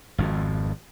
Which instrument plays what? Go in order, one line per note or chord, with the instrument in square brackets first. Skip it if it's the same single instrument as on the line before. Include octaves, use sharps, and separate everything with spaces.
[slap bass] G#1 F2